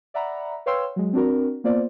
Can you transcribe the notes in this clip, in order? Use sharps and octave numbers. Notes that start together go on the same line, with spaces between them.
D5 E5 F#5 A#5 B5
B4 C#5 F5 G5 C6 E6
F#3 G#3
C4 D4 F#4 A#4
A#3 B3 F4 C5 D5